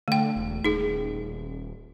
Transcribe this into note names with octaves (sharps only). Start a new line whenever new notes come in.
D3 A3 G5
E1
D#1 D#4 G#4